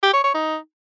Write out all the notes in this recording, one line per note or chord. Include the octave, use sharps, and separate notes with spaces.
G4
C#5
C#5
D#4